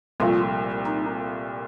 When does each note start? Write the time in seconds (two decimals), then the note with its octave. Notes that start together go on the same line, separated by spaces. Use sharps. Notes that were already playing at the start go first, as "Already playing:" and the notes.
0.20 C2 A#2 F3 A3 F4
0.86 D#4